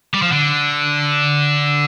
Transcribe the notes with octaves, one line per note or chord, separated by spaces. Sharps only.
G3
F3
D3